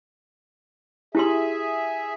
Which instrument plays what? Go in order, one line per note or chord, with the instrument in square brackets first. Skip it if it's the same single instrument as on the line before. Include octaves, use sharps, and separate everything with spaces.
[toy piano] E4 G4 C6 [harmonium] G#4 E5